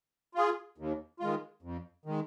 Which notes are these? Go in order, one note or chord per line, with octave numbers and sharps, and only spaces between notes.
F4 G#4
D#2
D#3 G#3 F4
F2
D#3 G#3